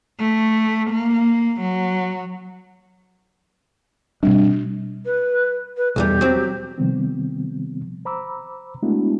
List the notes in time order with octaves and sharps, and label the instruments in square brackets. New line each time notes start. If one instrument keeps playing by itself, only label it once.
[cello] A3
A#3
F#3
[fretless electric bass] B2 C4 D4 [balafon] G3
[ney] B4
B4
[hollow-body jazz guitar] B1 E2 G3 [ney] G4
[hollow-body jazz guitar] F#3 C4
[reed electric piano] C3 D#3 F3 G3 B3 C4
C5 A#5 B5 D6 E6
G#3 A3 B3 D4 E4 F#4